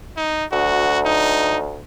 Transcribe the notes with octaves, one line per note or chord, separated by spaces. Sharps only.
D#4
D2 F#4
D#4